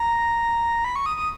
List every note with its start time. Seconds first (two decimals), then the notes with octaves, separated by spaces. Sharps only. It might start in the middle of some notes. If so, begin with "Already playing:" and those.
Already playing: A#5
0.84 B5
0.96 C#6
1.06 D#6
1.17 D#6